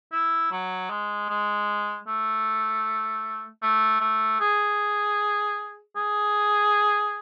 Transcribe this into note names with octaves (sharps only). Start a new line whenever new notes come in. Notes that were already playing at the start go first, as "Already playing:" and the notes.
E4
F#3
G#3
G#3
A3
A3
A3
G#4
G#4